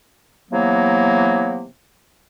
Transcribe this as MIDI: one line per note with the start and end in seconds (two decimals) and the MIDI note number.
0.51 1.66 48
0.51 1.66 52
0.51 1.66 54
0.51 1.66 58
0.51 1.66 59